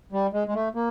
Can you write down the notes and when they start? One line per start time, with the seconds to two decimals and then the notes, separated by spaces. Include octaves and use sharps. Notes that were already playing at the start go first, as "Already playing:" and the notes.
0.12 G3
0.33 G#3
0.48 G#3
0.54 A3
0.75 A#3